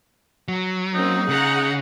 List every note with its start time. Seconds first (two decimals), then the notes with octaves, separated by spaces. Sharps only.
0.48 F#3
0.94 A#3 C4 C#4 D#4
1.29 C#3 G#4 F#5 A#5